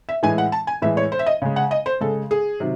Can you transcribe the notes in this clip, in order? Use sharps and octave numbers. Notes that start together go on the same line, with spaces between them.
E5
A2 E3 G#3 G#5
F#5
A5
G#5
A2 E3 G#3 E5
C#5
C5
E5
D#5
C#3 G#3
F#5
D#5
C5
C#3 G#3 A4
G#4
C3 D#3 F#3